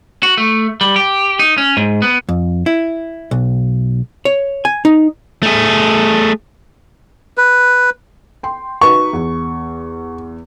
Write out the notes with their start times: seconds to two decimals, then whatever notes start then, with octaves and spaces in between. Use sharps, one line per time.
0.23 F#4
0.38 A3
0.81 G3
0.96 G4
1.39 D#4
1.58 C#4
1.77 G#2
2.02 B3
2.29 F2
2.66 E4
3.31 B1
4.25 C#5
4.65 G#5
4.85 D#4
5.43 A3 G#4
7.38 B4
8.43 G5 C6
8.81 D#4 F#4 B4 C#6
9.13 E2